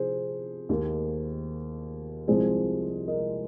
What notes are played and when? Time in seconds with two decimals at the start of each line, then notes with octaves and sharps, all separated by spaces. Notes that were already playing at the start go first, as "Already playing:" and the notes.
Already playing: C3 F3 G#4 C5
0.69 D#2 D#3 A#3
2.28 C2 C3 F3 G#3 G#4 C5
3.07 A#4 D#5